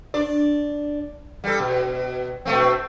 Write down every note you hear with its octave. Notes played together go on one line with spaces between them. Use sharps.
D4 D5
G3 A4
B2
B2 A3 C4